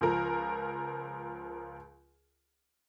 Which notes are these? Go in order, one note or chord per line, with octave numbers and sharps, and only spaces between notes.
C#2 F3 A#4